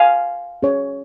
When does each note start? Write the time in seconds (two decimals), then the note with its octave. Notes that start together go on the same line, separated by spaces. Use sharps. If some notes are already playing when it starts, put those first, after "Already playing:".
Already playing: F5 G#5
0.62 C#4 G#4 C#5